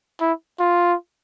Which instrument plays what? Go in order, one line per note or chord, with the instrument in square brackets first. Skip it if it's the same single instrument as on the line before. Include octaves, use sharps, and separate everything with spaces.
[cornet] E4
F4